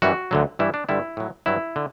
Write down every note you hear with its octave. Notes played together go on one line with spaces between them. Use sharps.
F#2 E3 G3 F#4
D2 D3 F#3
G2 E3 G3 E4
D4
G2 D3 G3 E4
A2 F#3
G2 F#3 E4
D3